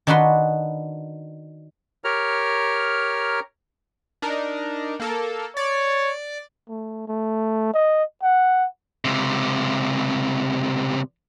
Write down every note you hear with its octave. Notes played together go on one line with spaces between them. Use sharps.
D#3 D4 D#4 F#4 B4 C6
G4 A#4 C#5 A#5 F6
D4 D#4 A#4
A#3 A4 A#4
C#5 D5
A3
A3
D#5
F#5
C#2 C3